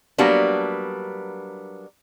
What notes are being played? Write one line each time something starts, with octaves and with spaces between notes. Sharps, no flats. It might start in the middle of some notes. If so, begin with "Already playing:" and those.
F#3 G3 A#3 B3 D4